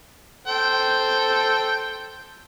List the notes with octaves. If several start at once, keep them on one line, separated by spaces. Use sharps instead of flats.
A4 C5 G5